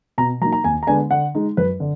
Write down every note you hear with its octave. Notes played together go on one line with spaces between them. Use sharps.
B2 A#5
F#3 A#3 D#4 A#5
A#5
D#2 G#5
A#5
D3 G#3 B3 D4 G#5
D3 F#5
G#3 D#4
F#2 B4
D3